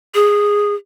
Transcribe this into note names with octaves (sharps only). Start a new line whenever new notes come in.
G#4